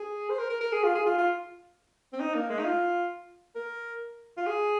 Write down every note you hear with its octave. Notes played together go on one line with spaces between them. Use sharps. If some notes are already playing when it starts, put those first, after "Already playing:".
Already playing: G#4
C5
A#4
A#4
A#4
G#4
F4
G#4
F4
F4
C4
D#4
A#3
G#3
D#4
F4
A#4
F4
G#4